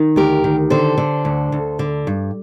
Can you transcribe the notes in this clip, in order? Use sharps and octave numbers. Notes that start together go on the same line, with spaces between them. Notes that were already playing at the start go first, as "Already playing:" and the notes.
Already playing: D#3
D2 G4 A#4
D#3
D3 A4 C5
D3
D2
D2
D3
G2